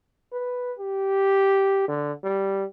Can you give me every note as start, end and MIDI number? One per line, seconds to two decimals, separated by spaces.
0.33 0.74 71
0.79 1.86 67
1.88 2.13 50
2.24 2.65 55